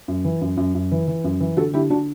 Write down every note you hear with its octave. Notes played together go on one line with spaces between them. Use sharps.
F#2
E3
F#2
F#2
F#2
E3
E3
F#2
E3
D3 F#4 A4
D3 E4 G4
D3 D4 F#4